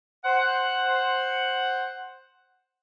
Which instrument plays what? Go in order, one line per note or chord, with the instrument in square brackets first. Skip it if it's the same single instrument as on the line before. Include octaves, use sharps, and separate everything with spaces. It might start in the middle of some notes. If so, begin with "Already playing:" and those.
[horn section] C5 F#5